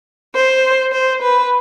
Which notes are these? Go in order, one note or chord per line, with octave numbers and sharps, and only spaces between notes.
C5
C5
B4